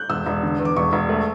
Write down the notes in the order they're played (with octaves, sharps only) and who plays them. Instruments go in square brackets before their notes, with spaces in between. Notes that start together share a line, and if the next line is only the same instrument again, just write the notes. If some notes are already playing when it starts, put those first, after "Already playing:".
Already playing: [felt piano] F#6 G6
[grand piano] E1 [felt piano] E6
[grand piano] E1
D3
E2
[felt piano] D6
[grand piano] E1 [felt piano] C#6
[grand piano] E1
A3